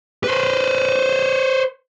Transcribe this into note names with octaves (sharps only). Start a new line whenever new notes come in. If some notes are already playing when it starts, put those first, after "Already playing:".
B4 C5